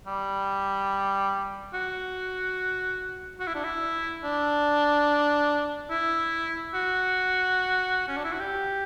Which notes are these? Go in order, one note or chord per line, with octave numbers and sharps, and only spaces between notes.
G3
F#4
F#4
E4
D4
E4
D4
E4
F#4
C#4
D4
E4
F#4
G4